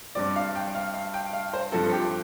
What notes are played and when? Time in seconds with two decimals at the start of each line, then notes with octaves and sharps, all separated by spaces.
0.15 G2 G3 C4 D5
0.36 F5
0.55 G5
0.75 F5
0.94 F5
1.14 G5
1.33 F5
1.53 C5
1.72 G2 F3 C4 A4
1.91 G4